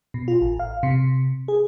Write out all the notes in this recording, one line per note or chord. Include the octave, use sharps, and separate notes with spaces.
B2
F4
A1
F5
C3
G#4